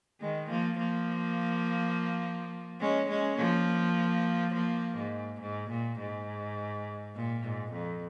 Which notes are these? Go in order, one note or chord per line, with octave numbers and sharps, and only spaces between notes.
D#3 G#3
F3 A#3
F3 A#3
G#3 C#4
G#3 C#4
F3 A#3
F3 A#3
G#2
G#2
A#2
G#2
A#2
G#2
F2